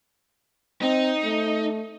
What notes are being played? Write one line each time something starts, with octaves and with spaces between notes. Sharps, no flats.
C4 D#4
A3